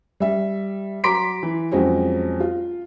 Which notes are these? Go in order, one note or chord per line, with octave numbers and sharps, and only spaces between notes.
G3 E5
F#3 A#5 C6 D6 B6 D7
E3
F2 F#3 G#3 C4 C#4
F4